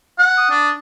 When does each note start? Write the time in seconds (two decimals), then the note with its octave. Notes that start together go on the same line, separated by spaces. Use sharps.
0.18 F#5
0.37 D#6
0.50 D4